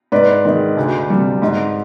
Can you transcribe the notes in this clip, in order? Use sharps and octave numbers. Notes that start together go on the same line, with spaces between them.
G#2 B4 D5
D#3 G#3
D2
C3 G3
G#2